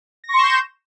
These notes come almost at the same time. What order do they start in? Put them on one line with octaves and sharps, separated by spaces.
A#6 C#6 C6 E7 G6